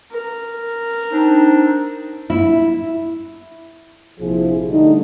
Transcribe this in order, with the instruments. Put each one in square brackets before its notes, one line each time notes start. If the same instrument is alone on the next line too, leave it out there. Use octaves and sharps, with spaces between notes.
[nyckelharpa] A#4
[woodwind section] C4 D4 D#4
[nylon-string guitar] E4
[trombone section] A#1 C3 F3 E4 G#4
D3 G3 A3 D#4